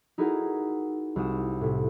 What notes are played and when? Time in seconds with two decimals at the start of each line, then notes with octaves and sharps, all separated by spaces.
0.18 D#4 E4 F#4 G#4 A#4 F#5
1.16 C2 F#4 D#6 E7
1.61 A2 C3